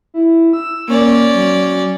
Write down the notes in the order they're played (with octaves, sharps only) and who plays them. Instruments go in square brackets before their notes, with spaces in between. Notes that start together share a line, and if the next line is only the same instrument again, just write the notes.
[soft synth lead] E4
E6
[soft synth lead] A#3 [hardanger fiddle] C#4 D5
[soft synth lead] F#3